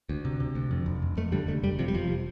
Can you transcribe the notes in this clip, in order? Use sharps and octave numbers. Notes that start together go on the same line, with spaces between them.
D2
C3
C3
D2
F2
F1
F1
F2 A3
D3 G3
F1 A3
F1 G3
C3 F3
G3
F1 F3